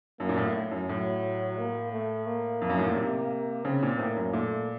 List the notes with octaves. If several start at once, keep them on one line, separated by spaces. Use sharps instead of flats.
F#2 A#3
A#2
A2
A2
F#2
A2 F#3
A#3
A3
A#3
F2
F#2
A2
A#2
C3
C#3 C4
A#2
A2 A#3
F#2
A#2 A3